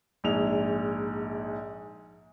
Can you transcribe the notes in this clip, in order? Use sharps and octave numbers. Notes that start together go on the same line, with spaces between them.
A#1 G#2 F7